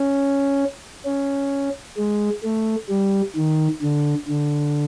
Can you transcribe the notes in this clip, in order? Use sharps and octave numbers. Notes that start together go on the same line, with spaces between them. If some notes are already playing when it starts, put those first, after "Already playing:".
Already playing: C#4
C#4
G#3
A3
G3
D#3
D3
D3